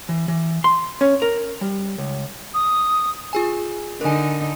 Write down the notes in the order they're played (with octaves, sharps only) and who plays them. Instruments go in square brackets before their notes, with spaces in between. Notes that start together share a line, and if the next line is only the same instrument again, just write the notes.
[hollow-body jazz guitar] E3
E3
C6
C#4
A#4
G3
C#2
[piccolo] D#6
[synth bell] F4 G#4 G#5
[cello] D3 D#4 [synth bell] A#4 G#5